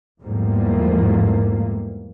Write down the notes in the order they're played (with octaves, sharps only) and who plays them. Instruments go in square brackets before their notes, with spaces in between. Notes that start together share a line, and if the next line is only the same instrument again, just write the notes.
[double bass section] E2 G#2 F3 G3 A3 A#3